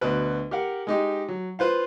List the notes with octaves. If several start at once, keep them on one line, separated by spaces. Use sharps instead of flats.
D2 B2 B4
G4 A#4 F5 F#5
G#3 D#4 G4
F#3
F4 B4 C5 F5